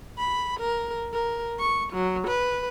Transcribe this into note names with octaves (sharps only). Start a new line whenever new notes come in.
B5
A#4
A#4
C#6
F#3
B4